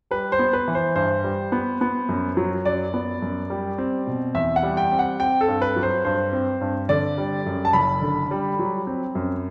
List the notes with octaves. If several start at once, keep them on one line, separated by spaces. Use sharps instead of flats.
G3 B4
C5
B3
B4
E3
C5
G2 C5
G3
B3
B3
F#2
F#3
F#2 D5
B3
F#2
G3
C4
B2
E2 E5
F#5
G3
G5
C4
F#5
C4 G5
A4
G2
B4
F#3
C5
G2 C5
C4
G2
D3 D5
G3
F#2
A5
F#1 B5
D3
G3
F#3
C4
F#2